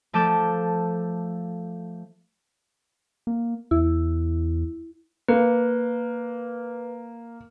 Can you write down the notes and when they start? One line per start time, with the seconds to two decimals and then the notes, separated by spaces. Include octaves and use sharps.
0.13 F3 A3 A5 D6 G6 E7
3.27 A#3
3.71 E2 E4
5.28 A#3 B4